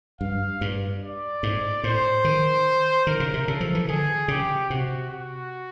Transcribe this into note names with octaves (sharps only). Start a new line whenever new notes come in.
G2 F5
G2
D5
G#2
A2 C5
D#3
D#3 A#4
C#3
C3
C#3 A4
F3
E3
D3 G#4
C#3 G4
C3 F#4
F#4